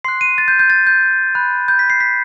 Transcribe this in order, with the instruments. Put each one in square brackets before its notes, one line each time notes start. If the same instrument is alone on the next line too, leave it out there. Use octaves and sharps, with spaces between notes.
[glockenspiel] C6 F#6 C7
D#7
A6
G6
G6
A6
G6
B5 F#6
G6
B6
C7
B6